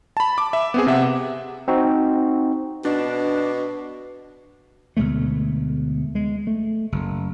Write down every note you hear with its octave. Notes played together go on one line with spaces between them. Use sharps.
A5 B5
D6
E5
B3 C4 G#4
C3 E5 F#5
C4 D#4 F#4
B2 D4
D2 B2 G#3 A3
G#3
A3
F#1